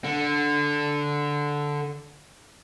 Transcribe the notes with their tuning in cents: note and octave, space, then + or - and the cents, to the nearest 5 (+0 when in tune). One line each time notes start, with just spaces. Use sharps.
D3 -5